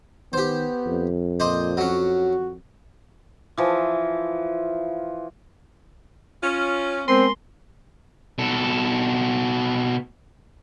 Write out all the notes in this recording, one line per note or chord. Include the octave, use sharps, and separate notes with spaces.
D#3 B3 G4 C5
F2
A#2 C5 D5 D#5
F#3 C#4 F#4
E3 F3
C#4 F4
G#3 B3 C4 A#4 C6
B2 A4